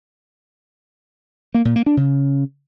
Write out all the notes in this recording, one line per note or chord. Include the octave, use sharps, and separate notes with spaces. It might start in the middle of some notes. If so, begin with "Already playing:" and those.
A#3
A#2
A#3
D4
C#3